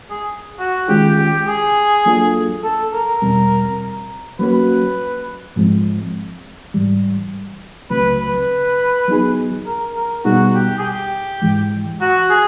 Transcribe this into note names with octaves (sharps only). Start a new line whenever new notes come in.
G#4
F#4
D#3 G#3 C#4 F4 G4 G#4
G4
G#4
F#3 A#3 D4 F4 A4
A4
A#4
E2 B2 G3 C4
F#3 A#3 C#4 F#4 B4
G#2 F3 G#3 C4
G#2 E3 G3
C#2 C#3 F#3 A3 C4 B4
B4
F#3 B3 D#4 G#4
A#4
A#4
B2 G3 B3 D#4 F#4 G#4
G4
G#4
G4
G#2 E3 G#3
F#4
G#4